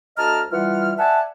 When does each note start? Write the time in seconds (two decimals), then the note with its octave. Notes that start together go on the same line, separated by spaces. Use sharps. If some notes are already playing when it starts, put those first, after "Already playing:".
0.17 D2 D#5 A5 A#5 F6
0.52 E3 G3 F4 F#5 F6
0.98 D5 E5 F#5 G#5 A5